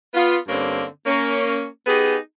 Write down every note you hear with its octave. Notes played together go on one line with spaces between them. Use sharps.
B3 F4
G2 D3 A#3 C4 C#4
A#3 C#4
B3 D#4 G4 G#4